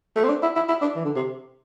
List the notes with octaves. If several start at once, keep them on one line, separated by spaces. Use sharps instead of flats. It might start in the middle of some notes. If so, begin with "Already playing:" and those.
A3
C4
D4
E4
E4
E4
D4
E3
D3
C3